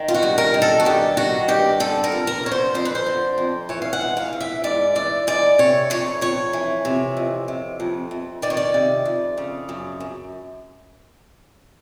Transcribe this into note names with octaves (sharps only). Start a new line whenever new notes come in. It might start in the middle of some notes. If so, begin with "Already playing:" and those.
Already playing: D#3
F4
F#4
G2
A#4
D#3
A4
F#4
G2 G4
D#3 F#4
G2 G4
D3 A4
A#4
F2
A#4
D3 C#5
C5
F2 C5
B4
C5
D3
F2
E3 C#5
F5
F#5
G#2
F5
E3
E5
G#2 D5
E3 D5
G#2 D5
C3 C#5
F2 C#5
F2 C#5
E3
C3
F2
C3
F2
F2
D#3 D5
C#5
D5
C3
F2
C#3
F#2
F#2